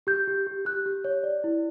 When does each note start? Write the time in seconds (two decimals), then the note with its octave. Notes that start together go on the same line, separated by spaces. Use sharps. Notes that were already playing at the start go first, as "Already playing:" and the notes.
0.07 G4 G6
0.27 G4
0.47 G4
0.65 G4 F#6
0.86 G4
1.05 C#5
1.24 D5
1.44 E4